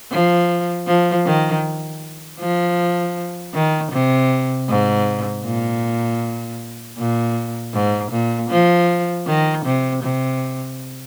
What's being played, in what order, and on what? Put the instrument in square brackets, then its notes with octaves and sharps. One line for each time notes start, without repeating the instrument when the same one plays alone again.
[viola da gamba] F3
F3
D#3
F3
D#3
C3
G#2
A#2
A#2
G#2
A#2
F3
D#3
C3
C3